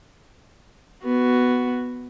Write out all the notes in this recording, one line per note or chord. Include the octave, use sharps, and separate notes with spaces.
B3 F#4